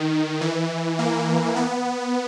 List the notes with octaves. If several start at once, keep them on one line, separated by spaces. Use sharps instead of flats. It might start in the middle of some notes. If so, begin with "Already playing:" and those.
Already playing: D#3
E3
A#3
B3